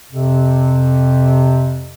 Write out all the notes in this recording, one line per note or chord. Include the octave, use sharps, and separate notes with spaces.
F2 C3